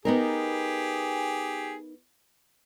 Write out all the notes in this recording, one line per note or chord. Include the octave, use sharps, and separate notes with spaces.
B3 D#4 G4 G#4 A#4